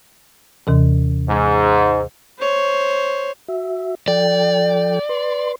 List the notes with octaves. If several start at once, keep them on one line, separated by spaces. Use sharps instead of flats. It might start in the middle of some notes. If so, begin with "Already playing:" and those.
D#2 C3 E3
G#2
C5 C#5
F#4 E5
F3 A4 D5 G5
B4 C6